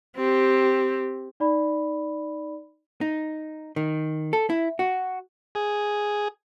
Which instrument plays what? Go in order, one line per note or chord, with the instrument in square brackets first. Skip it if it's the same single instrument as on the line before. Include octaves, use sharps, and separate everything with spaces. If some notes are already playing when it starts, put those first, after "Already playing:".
[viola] C4 G4
[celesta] D#4 D5 B5
[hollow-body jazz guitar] D#4
D#3
A4
E4
F#4
[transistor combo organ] G#4